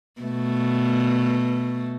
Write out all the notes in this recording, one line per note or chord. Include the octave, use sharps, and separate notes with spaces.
B2 A3